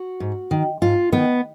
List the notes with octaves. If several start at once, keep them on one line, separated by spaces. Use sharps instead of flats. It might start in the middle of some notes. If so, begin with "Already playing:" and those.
Already playing: F#4
G#2
D#3
G#2 F4
D#3 B3